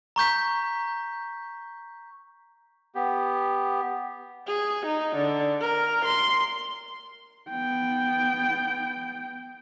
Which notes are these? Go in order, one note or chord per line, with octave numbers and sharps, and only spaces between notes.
A#5 C#6 G6 B6
B3 G4
G#4
D#4
D3
A#4
C6
B3 G5